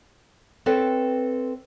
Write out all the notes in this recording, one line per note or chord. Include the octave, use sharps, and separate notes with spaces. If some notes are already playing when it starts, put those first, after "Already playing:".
C4 A4 B4 C#5 E5 G5